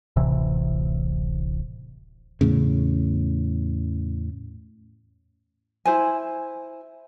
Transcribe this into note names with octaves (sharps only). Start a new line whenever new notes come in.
D1 A1 C3 E3
E2 A2 C#3
E4 C5 G#5